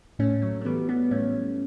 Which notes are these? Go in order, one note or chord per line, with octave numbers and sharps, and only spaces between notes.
A2 A3 C#4
F#3 A3
A3
E3 G3 B3
G3 B3
A2 A3 C#4